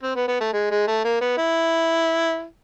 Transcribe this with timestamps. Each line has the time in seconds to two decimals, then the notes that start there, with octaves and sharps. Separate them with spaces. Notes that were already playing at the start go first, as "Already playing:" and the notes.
0.03 C4
0.16 B3
0.28 B3
0.40 A3
0.53 G#3
0.71 G#3
0.87 A3
1.04 A#3
1.21 B3
1.37 E4